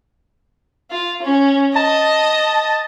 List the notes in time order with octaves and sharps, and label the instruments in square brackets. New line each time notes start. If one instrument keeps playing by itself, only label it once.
[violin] F4
C#4
[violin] D#5 [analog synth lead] A5